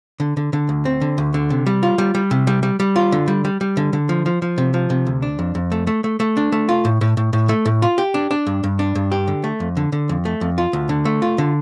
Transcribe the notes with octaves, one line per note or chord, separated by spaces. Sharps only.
D3
D3
D3
D2
C4
D3
D2
D3
C3
G3
F4
G3
G3
C3
G3
G3
G3
F4
D3
G3
G3
G3
D3
D3
F3
F3
F3
C3
F3
C3
D2
D4
F2
F2
A3
A3
A3
A3
D4
A3
F4
A2
A2
A2
A2
A3
A2
F4
G4
D4
D4
G2
G2
D4
G2
G4
D3
A3
F2
D3
D3
F2
A3
F2
F4
D2
D3
A3
F4
D3